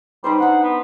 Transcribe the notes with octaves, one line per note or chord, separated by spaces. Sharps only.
G3 D#4 B4 C5
D4 D#4 F#5
B3